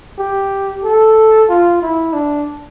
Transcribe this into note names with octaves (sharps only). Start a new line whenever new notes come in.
G4
A4
F4
E4
D4